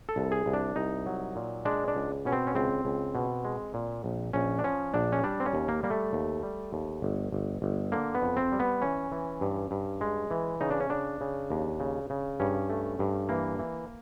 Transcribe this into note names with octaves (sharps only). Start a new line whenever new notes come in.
A4
C2
G#4
C2
D4
C2 D#4
F#3
A#2
G#3 D4
D4
C#2
B2 C#4
C4
C#4
C#2 C4
C#2
B2
G#3
A#2
A#1
A#1 C#4
D4
F3 C#4
A#1 D4
C#4
G3 D4
C4
C#4
D#2
A#3
G3 A#3
A3
D#2
G3
D#2
G1
G1
G1
D3 A#3
B3
F2
C4
G3
B3
E3 C#4
E3
G2
G2
G#3
E3
C#3 D#4
D4
C#4
C#3 D4
C#3
D#2
C#3
C#3
G2 C#4
A3
G2
E3 A#3
E3